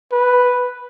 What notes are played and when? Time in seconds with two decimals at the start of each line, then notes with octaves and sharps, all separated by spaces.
0.12 B4